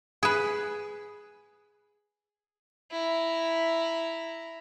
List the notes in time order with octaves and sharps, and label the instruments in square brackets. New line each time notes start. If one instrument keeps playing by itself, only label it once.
[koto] G#4 B4
[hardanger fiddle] E4 A#5